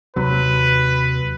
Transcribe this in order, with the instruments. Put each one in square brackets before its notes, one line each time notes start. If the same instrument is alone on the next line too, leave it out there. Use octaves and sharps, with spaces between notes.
[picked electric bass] D#2 C3 F#3 [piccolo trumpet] B4